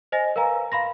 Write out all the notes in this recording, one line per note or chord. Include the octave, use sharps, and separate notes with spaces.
C5 D#5 G#5 A#6
A#4 B4 F5 G#5 A#5
F5 B5 C6 A#6